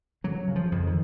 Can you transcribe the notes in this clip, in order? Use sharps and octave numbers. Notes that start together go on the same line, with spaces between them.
C#3 F#3
C#3
F3
F2
D#3